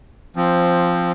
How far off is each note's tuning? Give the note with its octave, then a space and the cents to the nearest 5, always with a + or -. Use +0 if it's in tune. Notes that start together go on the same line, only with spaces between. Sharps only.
F3 +0 C4 +5